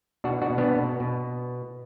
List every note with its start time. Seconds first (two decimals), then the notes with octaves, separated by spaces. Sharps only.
0.24 B2 D4 F#4
0.42 D4 F#4
0.50 B2
0.58 B3 D4
0.76 B2
1.00 B2